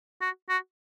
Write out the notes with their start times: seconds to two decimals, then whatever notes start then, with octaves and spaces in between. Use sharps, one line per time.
0.21 F#4
0.49 F#4